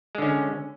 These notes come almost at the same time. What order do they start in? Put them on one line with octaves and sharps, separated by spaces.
G#3 D3 C#4